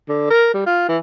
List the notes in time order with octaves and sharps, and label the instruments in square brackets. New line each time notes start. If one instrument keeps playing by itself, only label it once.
[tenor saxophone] D3
A#4
G3
F4
E3